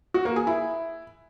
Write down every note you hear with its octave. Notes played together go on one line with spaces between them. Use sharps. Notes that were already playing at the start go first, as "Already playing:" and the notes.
F#4
A#3
G#4
E4